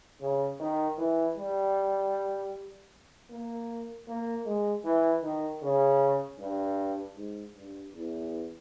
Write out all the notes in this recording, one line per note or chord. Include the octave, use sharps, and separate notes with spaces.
C#3
D#3
E3
G3
A#3
A#3
G#3
E3
D#3
C#3
G2
G#2
G2
E2